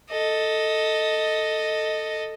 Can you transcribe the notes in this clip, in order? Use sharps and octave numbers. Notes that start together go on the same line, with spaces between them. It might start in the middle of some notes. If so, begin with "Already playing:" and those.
A4 D#5